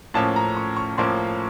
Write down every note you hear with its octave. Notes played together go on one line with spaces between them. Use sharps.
A2 F3 A#3 C#4 A5
A#5
C#6
C#6
A2 F3 A#3 C#4 C6